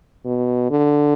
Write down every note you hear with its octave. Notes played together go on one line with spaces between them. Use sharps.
B2
D3